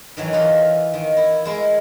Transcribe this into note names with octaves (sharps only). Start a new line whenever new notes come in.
D#3 E3 F#3
E3 D#4 F4
D#3
E4
G#3 E4 A#4